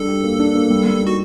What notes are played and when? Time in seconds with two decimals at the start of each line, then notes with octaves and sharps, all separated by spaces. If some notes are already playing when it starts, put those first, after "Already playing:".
Already playing: G3 D4 A4
0.08 G4
0.24 A#3
0.39 D4
0.55 A#3
0.70 G3
0.86 G3
1.02 D#4 F#4